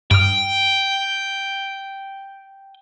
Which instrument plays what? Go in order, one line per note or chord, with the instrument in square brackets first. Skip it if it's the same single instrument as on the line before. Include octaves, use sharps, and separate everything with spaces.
[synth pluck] G2 D#6 F6 [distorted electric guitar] G5